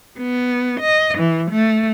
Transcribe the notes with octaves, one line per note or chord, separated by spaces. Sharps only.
B3
D#5
E3
A3